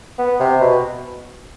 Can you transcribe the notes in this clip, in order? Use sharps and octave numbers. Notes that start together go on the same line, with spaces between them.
B3
C3
B2